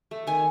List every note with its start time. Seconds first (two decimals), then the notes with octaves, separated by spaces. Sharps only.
0.11 A3
0.27 D#3 G#5